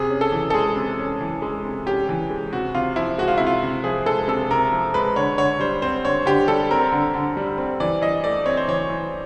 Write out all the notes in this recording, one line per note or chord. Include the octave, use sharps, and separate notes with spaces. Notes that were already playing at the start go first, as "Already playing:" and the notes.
Already playing: C3 G#4
C#4
A4
E3
A4
G#3 G#4
C3
C#4
E3
G#3
C3
C#4 G4
E3
G#3
C3 F#4
C3 F4
F3 E4
G#3 F#4
F4
C3 E4
F4
C3
F3 G#4
G#3 A4
C3 A4
C3 A#4
F3
G#3 B4
D3 C#5
D3 C#5
G3 C5
C4 C5
D3 C#5
D3 G4
G3 A4
C4 A#4
D3
D3
G3
C4
E3 D5
E3 D#5
A3 D5
C4 C#5
C5
E3 C#5
E3